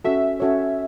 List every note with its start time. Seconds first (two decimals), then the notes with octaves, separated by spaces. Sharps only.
0.04 C#4 F#4 A4 E5
0.40 C#4 F#4 A4 C#5